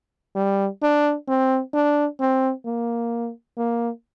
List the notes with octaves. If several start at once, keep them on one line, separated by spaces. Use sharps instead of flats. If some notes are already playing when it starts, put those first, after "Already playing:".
G3
D4
C4
D4
C4
A#3
A#3